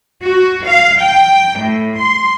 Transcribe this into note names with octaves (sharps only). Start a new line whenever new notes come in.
F#4
F5
G5
A2
C6